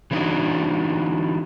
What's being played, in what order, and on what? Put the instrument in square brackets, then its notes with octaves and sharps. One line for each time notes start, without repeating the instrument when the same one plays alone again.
[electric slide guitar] E3 G3 C4 D4 D#4 F#4